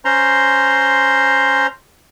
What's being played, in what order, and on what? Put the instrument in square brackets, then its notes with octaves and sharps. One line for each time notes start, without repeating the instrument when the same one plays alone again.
[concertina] C#4 C5 A#5 C6